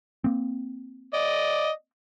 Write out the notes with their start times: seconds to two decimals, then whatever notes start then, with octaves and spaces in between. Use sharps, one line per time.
0.24 A#3 C4
1.14 D5 D#5